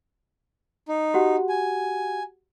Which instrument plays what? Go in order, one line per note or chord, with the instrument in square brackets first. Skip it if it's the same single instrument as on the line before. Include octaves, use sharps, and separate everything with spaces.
[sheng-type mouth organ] D#4
[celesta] F#4 G4 F#5
[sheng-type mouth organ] G#5